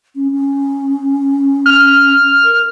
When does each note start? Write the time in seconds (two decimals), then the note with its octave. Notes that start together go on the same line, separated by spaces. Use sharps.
0.15 C#4
0.31 C#4
1.66 F6
2.44 A#4